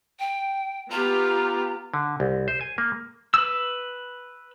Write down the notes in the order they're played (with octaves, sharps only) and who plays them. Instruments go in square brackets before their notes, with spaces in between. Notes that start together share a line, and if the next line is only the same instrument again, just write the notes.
[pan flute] G5
[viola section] B3 F4 G4 [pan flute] A#5
[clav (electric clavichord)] D3
C2
C5
G#5
A#3
[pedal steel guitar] B4 E6